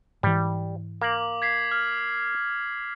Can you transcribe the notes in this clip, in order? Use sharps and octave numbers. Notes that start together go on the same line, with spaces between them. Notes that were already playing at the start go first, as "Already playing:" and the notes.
G#2 E3 G3
A#3 D6 F#7
G#6 B6 C7
F6